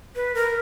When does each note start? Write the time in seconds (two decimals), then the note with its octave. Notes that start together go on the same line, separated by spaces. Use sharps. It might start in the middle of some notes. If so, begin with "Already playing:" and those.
0.16 B4
0.35 A#4